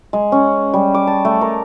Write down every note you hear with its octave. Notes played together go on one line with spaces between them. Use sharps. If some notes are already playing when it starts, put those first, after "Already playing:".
G#3
C#4
G3
D6
A5
A3
A#4